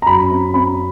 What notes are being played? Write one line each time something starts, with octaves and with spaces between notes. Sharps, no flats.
A#5
F#2 B5
C4
C4 B5